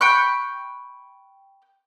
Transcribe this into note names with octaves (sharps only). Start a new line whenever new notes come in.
G5 B5 C#6 F#6